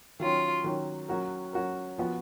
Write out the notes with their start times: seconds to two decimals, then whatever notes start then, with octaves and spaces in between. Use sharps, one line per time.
0.20 D#3 F#3 C#4 F4
0.64 D#3 F#3 C#4
1.09 F#3 C#4 F#4 A#4
1.53 F#3 C#4 F#4 A#4
1.98 F3 B3 F#4